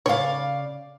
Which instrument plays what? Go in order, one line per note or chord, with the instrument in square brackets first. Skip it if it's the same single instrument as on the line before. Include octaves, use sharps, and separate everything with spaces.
[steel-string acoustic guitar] C#3 D5 F5 [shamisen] C#5